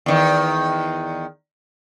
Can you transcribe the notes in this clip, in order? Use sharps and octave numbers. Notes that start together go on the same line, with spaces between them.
E2 D#3